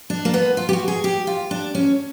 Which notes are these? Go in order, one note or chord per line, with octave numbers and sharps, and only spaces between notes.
D4
A#3
B3
F4
G4
F#4
G#4
G4
F4
D4
C#4